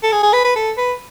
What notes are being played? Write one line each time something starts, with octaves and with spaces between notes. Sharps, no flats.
A4
G#4
G#4
B4
B4
A4
B4